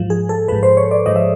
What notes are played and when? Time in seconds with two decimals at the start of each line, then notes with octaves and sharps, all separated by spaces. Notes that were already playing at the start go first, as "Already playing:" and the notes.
Already playing: G#2 F3
0.10 G#4
0.29 A4
0.48 G#2 F3 B4
0.63 C5
0.77 C#5
0.91 D5
1.06 G#2 F3 D#5
1.16 E5